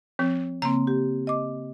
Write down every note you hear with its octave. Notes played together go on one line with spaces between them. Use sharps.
F3 C4
C#3 A#3 C4 A#5
G4
D#5 D6